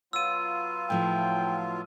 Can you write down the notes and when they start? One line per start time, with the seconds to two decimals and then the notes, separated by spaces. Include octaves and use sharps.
0.13 F#3 B3 F4 E6 D#7
0.90 A2 F3 E4 G5